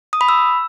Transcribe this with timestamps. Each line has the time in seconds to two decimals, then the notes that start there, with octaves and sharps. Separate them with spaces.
0.13 D#6
0.21 B5
0.29 E6